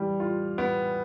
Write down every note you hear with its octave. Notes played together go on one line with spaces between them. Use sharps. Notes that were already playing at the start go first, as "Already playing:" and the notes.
Already playing: E3 G3
F4
B3